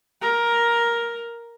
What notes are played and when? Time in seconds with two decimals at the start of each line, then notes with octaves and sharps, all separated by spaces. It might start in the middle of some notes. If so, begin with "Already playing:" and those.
0.22 A#4